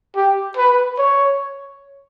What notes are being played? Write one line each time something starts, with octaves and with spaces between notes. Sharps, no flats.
G4
B4
C#5